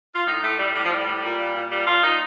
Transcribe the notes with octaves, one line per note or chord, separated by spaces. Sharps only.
F4
A2 D#4
A2 A3
A2 G3
A2 G3
F3
A2 G3
A2
A#2
A#2
A#2
A#2 G3
A#2 F4
A#2 D#4